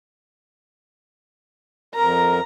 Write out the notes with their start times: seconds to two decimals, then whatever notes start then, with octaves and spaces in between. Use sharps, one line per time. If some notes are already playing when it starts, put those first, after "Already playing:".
1.95 F2 A#4 A#5